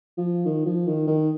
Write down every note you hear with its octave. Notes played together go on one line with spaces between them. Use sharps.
F3
D#3
F3
D#3
D#3